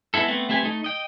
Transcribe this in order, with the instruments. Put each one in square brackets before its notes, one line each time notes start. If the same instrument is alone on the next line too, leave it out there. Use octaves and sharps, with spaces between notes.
[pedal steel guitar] G#3 B3 E4 A4
A3 B3 C4
A3 C4 G4 B4 G#5
A3 D#4
D#5 G5